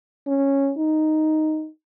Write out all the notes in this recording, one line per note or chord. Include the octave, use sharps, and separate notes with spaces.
C#4
D#4